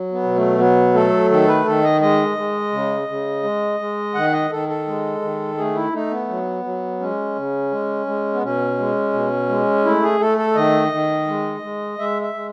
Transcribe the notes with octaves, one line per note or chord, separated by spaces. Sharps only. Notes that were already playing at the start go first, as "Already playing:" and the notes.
Already playing: F#3
B3
B2
A3
F#3 B3
A3 A4
D#3 A4
B4
D#3 A4
D#5
G#3 D#5
G#3
C#3
C#3
G#3
G#3
D#3 F#5
D#5
D#3 A4
A4
G#3
D#3
A3 G#4
E4
A3 D#4
B3
F#3
F#3
G#3 C#4
C#3
G#3
G#3
B3
B2 C#4
G#3
B2
G#3
A3 E4
G#4
A3 A4
A4
D#3 D#5
D#3
G#3
G#3
G#3 E5
E5
G#3